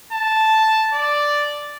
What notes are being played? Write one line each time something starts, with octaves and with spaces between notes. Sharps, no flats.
A5
D5